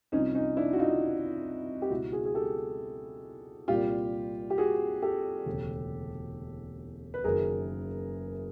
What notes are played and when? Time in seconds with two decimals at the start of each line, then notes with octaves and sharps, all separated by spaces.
0.12 C2 C3 F3 C#4 D#4
0.35 C#4 D#4
0.57 D4 E4
0.73 F#4
0.79 D#4 F4
1.82 G4
1.90 C#2 B2 F#3 E4 F#4
2.12 F#4 G#4
2.25 G#4
2.35 G4 A4
3.68 C2 A#2 G3 F4 G4
4.50 G4
4.58 F#4 G#4
5.02 G4 A4
5.46 E1 D2 C#3
7.14 B4
7.24 F#1 F#2 D#3 F#3 G#4 A#4